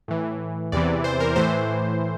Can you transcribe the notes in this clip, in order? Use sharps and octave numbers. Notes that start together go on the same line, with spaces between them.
A2 E3
E2 C3 E3 D5
C5
A#4
A2 E3 C5